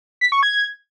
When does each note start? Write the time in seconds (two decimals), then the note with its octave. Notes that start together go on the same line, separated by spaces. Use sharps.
0.21 B6
0.32 C#6
0.43 G#6